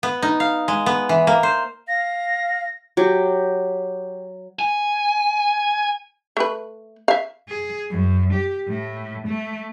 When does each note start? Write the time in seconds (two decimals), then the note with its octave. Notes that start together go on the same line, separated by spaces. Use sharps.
0.03 B3
0.22 D#4
0.40 F5
0.68 G#3
0.86 B3
1.09 E3
1.27 A#3
1.43 C5
1.88 F5 A#6
2.97 F#3 G4
4.59 G#5
6.37 A3 B4
7.08 E5 F5
7.49 G#4
7.90 F#2
8.33 G4
8.67 A2
9.27 A3